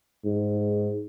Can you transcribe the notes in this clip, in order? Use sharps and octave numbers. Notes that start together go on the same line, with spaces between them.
G#2